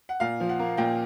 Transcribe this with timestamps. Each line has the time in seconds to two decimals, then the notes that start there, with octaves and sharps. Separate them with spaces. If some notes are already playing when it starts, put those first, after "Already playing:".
0.09 F#5
0.20 A#2 F5
0.40 F3
0.49 F#5
0.59 A#3
0.77 A#2 G5